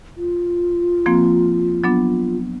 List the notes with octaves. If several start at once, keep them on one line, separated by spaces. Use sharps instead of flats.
F4
F3 A#3 C4
F#3 B3 D4